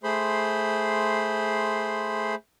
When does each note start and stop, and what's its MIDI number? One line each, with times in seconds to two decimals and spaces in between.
0.04 2.35 57
0.04 2.35 68
0.04 2.35 72
0.04 2.35 83
0.04 2.35 84